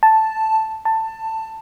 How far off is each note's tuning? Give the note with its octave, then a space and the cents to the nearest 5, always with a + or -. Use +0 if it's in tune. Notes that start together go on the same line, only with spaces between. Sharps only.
A5 +0
A5 +15